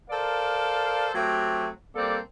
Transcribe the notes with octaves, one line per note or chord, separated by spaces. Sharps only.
A4 A#4 C5 D5 F5
F#3 A3 C4 F#4 G4
G3 A#3 C4 A4 D5